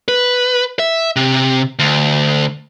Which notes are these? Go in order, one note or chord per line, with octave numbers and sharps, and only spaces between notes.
B4
E5
C3
D2